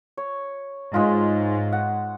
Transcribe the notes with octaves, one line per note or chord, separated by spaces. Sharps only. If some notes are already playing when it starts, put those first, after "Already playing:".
C#5
G#2 G#3 F4
F#5